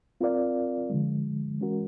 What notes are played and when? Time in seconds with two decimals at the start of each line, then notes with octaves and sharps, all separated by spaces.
0.21 C4 F4 A#4 D5 F5
0.90 D3 F3 G#3
1.60 E3 G#3 C#4 F#4 A#4